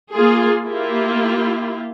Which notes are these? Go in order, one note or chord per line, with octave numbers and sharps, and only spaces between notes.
A#3 F4 G#4
A#3 E4 F4 G4